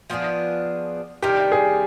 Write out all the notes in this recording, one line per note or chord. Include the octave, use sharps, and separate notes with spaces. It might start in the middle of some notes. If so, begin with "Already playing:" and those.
F3 B3 D4 G#4
C3 D#3 G3 D4 G4
G#4